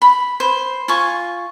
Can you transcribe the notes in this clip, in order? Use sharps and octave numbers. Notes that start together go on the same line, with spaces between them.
B5
C5
F4 G#5 C#6